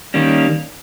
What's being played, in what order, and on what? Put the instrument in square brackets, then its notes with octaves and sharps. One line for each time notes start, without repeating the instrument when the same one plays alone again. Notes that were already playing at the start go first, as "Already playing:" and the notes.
[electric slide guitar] D#3 G3 A#3 C#4